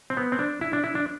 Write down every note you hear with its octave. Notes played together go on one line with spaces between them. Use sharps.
C4
B3
C4
D4
E4
D4
E4
D4